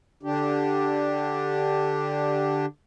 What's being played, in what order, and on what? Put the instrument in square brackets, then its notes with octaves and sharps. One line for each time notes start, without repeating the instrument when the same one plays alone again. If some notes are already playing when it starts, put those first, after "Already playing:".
[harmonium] D3 D4 G4